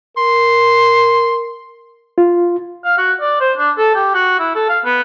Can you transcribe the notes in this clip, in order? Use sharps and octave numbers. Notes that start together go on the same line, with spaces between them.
A#4 C6
F4
F5
F#4
D5
C5
D4
A4
G4
F#4
E4
A4
F5
B3